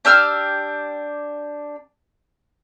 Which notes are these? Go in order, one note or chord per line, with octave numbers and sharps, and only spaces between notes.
D4 G4 E6 F6